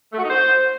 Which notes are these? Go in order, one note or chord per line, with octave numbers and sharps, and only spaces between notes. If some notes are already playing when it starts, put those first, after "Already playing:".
A3
F#4
D#4
C5